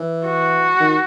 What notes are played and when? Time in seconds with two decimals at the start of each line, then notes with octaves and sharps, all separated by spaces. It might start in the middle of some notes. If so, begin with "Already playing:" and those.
Already playing: E3
0.26 F#4
0.80 D#3